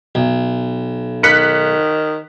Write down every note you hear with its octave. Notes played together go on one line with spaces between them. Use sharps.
B1
D#3 F#6 B6 C#7